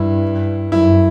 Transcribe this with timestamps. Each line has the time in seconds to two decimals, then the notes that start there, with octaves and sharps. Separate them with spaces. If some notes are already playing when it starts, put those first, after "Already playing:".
Already playing: G2 E4
0.71 F#2 E4